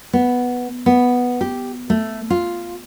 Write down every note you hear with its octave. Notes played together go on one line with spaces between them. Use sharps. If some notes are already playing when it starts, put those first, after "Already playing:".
B3
B3
G4
A3
F4